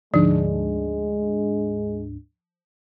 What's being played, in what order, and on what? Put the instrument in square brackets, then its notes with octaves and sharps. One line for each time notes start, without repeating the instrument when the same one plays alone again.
[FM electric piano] D2 G#2 D4 [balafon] F3 [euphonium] G#3